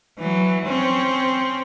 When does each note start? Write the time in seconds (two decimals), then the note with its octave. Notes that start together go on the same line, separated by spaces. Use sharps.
0.19 E3 F#3
0.66 C4 C#4